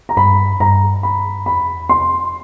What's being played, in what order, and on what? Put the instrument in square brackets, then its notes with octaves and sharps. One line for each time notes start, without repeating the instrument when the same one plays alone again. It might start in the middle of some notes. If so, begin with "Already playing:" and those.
[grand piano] A#5
[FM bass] G2 [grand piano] B5
[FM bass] G2 [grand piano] A#5
[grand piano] B5
[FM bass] F2 [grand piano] B5
[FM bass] E2
[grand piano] C6
[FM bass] F2